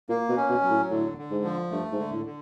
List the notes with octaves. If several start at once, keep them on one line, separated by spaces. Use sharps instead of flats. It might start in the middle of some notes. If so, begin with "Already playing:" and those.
A#2 A#3
B2
C#4
B2
F#3
A2
A2 D3
D3
G#2
F3
G2 A3
G#2
D3
A2
D3